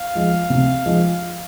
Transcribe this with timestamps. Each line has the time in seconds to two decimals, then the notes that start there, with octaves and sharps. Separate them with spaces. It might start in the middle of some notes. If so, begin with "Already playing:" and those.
Already playing: F5
0.15 F3 G#3
0.50 C3
0.86 F3 G#3